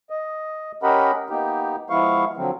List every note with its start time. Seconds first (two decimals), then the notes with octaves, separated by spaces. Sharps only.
0.10 D#5
0.83 C#4 G4 A#4 D#5 F#5 B5
1.30 A#3 B3 D#4 G4
1.90 F3 G#3 B3 E4 F5 C#6
2.37 D3 F3 F#3 C4